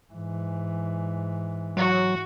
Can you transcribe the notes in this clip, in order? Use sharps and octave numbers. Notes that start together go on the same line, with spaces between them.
G#2 E3
F#3 F#4